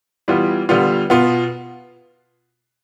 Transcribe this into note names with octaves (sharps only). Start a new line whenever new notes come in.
E3 G3 B3 F4
D3 G3 B3 F4
B2 B3 F4